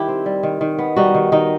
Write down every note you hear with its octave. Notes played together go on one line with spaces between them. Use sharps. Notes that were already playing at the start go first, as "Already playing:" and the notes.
Already playing: D#3 G3 E4 G4
C4
G3
D#3
D#3
B3
G3 D#4 F#4
D#3
D#3 D#4